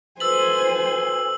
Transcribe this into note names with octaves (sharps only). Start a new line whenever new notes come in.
F#4 A4 B4 C5 G#5 E6 F#7